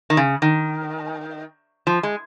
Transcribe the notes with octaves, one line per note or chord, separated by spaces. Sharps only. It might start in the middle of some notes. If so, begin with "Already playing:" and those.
D#3
C#3
D#3
F3
G#3